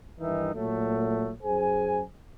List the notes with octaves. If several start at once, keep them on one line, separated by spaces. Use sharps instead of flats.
G2 D#3 E3 D#4 E5
A#2 F#3 A3
F#2 G#4 C5 G#5